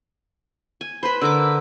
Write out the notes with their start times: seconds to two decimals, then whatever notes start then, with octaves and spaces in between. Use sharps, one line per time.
0.81 G#5
1.03 B4 C5 B5
1.21 D3 A#4 D6 E6